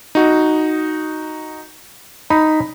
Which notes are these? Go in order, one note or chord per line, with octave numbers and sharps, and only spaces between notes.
D#4 F#4
D#4 B5